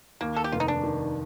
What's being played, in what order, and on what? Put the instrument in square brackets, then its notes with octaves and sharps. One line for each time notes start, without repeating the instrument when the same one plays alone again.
[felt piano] D#2 [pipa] A#3
[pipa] A4
G4
[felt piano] F1 [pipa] F4
[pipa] D#4
D4
[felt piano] D#3